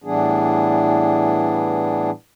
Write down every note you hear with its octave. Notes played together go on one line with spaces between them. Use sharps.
A2 E3 G3 B3 D4 G#4